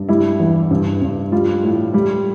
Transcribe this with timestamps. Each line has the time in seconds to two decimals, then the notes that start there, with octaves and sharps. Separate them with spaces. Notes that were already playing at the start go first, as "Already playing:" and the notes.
Already playing: G2
0.09 G3 E4
0.39 E2
0.71 G2
1.02 G2
1.32 G3 F4
1.63 A2
1.94 G3